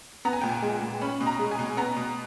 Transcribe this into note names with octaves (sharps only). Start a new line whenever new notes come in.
B3 A#5
G#5
A#2 G5
G#5
G#3
A#2
C#4 B5
B2
A#5
G#3
G#5
B2
B3 A#5
B2